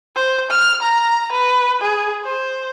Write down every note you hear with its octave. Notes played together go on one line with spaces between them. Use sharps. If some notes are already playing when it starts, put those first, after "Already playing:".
C5
F6
A#5
B4
G#4
C5